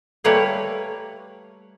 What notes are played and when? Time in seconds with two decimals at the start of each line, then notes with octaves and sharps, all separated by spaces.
0.24 G3 A3 A#3 A#4 B4 C#5